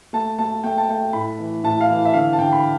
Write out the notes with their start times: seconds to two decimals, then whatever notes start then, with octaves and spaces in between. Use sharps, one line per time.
0.13 A3 A5
0.39 A3 A5
0.64 A3 G5
0.78 A5
0.89 A3 G5
1.13 A2 B5
1.39 E3
1.64 A2 A5
1.81 F5
1.89 E3
2.05 E5
2.14 D3 F5
2.33 A5
2.39 D3 G5
2.52 B5